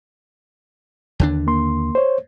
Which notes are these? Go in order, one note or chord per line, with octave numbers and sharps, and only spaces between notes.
D#2 D3 D4
A#3 C6
C5 C#5